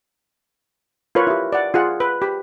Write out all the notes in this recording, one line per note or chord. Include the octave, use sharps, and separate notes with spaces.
F4 A#4 B4 C#5
E4 G4
D5 F#5
F4 G#4 F#5
B4
G4 B5